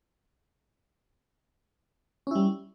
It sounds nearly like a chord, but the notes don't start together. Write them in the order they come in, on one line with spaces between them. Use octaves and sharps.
C#4 E4 G3